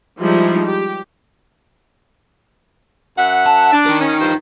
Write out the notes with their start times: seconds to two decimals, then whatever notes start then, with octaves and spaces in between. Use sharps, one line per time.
0.20 F3 G3 G#3 D#4 E4
0.67 G4
3.18 F#2 E5 F#5
3.46 A5
3.72 D4
3.86 D#4 A#4
4.01 C#4
4.20 G2 F3 C5